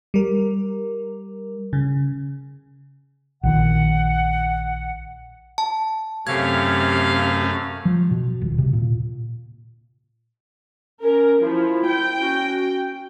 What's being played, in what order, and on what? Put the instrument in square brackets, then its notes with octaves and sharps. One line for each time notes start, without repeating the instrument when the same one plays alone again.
[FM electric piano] G3 A#4
C#3
[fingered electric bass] A#1 D#3 [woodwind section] F#5
[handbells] A5
[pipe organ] F#2 A3 C#4 [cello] C3 [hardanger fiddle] F5 [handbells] G#6
[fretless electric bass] F3
B2
D#1
C3
A#2
[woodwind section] C#4 [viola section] A#4
[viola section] F3 [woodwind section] E4
[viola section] G5
[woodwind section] C#4 F#4